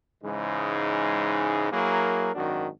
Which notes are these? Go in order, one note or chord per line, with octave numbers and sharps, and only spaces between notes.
G#2 C#3 E3 G#3 D#4
F#3 A#3 E4 G#4 A#4
G#1 F#2 D#3 D4 F#4